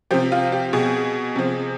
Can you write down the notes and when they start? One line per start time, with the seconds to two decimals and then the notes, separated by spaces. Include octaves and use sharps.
0.11 C3 F3 G4
0.32 F4
0.52 G4
0.73 B2 G#4
1.36 C3 F3